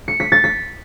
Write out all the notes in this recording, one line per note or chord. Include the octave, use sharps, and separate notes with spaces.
C#7
B6
A6
B6